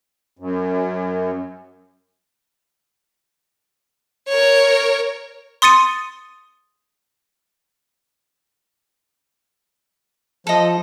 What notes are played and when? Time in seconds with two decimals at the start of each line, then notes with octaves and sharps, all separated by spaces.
0.39 F#2
4.29 A#4 C#5
5.62 C6 D#6 A6 C#7 D#7
10.47 F3 A4 D#5